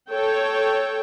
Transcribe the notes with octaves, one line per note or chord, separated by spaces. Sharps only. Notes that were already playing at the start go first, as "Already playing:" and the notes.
A4 C#5 G5